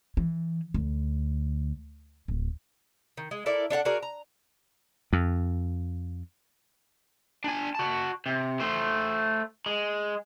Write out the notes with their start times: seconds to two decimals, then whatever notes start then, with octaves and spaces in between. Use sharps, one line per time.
0.17 E3
0.74 D2
2.28 D1
3.17 D#3
3.31 G#3
3.46 E4 A4 A#4 D5
3.70 D4 A4 F5 F#5
3.85 F#4 G#4 A#4 D5
4.03 A#5
5.13 F2
7.44 D4 G#5
7.75 F#4 A5
8.26 C3
8.60 A3 C5
9.66 G#3